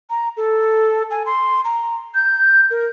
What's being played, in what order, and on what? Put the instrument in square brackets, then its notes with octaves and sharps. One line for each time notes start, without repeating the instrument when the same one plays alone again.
[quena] A#5
A4
G#5
C6
A#5
G6
A#4